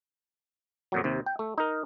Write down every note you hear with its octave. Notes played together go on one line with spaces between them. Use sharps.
F2 A#2 F#3
D#2 C3
G5
A3
D#4 A#4